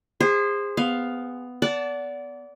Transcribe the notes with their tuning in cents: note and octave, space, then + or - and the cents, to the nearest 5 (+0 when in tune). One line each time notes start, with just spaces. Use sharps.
G#4 -30 C5 +0
B3 +10 F5 +5
D5 -25 F#5 +0 A5 +0